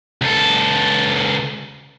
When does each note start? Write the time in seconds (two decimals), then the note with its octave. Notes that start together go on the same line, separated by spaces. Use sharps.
0.22 C#2 A4